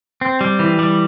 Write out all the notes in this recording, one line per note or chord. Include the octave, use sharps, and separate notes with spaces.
C4
G3
E3
G3